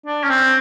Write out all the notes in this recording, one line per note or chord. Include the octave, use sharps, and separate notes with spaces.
D4
C#4
C4